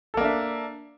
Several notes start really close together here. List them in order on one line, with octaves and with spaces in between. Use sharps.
A4 A#3 D4 E5